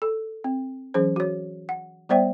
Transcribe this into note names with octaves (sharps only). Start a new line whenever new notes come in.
A4
C4
E3 F#3 C#4 G#4 C5
F#4 C#5
F#5
G3 B3 C5 D5 E5 G5